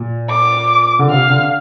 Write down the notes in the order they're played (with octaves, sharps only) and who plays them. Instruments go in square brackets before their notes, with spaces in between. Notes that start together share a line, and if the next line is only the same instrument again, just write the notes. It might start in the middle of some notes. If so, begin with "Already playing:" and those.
Already playing: [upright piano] A#2
[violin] D6
[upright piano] D3
[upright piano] C3 [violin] F5
[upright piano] D3